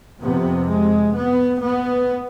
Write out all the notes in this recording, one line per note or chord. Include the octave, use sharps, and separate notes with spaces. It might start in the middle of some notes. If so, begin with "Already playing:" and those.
F2 C3 B3
G#3
B3
B3